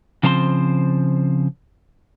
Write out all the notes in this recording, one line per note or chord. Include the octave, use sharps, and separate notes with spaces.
C#3 F3 C4 C5 A#5 C6